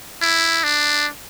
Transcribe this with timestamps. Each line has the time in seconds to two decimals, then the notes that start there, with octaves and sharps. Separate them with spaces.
0.22 E4
0.63 D4